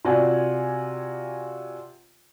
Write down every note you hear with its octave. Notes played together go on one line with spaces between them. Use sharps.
C3 F4 F#4 D5 G#5